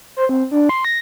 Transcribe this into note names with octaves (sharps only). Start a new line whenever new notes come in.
C5
C4
D4
C6
A#6